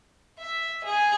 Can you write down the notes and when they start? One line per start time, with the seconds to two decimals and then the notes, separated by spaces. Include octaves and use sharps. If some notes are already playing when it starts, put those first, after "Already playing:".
0.39 E5
0.84 G#4